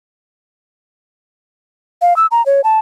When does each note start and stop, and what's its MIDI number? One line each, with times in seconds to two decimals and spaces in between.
2.02 2.16 77
2.17 2.26 88
2.31 2.44 82
2.46 2.61 73
2.64 2.80 81